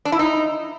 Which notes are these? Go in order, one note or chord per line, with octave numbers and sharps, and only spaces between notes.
D4
E4
D#4